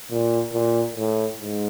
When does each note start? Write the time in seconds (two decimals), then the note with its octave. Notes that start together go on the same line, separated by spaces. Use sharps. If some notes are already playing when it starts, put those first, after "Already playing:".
0.11 A#2
0.53 A#2
0.96 A2
1.39 G#2